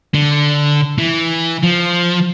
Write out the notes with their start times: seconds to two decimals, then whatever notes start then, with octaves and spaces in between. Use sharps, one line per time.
0.14 D3
0.98 E3
1.63 F3